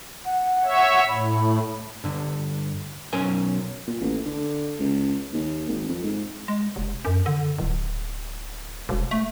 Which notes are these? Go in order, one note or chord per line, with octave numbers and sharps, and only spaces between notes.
F#5
C#5 E5
A2 B5
G2 D3
B1 F#3 C#4 A#4 C5 G#5
A#2
A1
D3
C#2
D#2
G#1
F2
G#2
G#3
F1
F#2
D3
D1
E1
A3